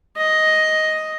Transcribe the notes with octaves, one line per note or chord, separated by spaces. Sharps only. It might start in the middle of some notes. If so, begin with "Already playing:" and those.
D#5